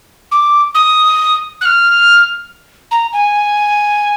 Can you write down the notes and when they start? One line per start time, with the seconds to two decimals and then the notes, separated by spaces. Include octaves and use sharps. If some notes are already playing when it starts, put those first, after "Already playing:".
0.32 D6
0.75 D#6
1.61 F#6
1.65 F6
2.91 A#5
3.13 G#5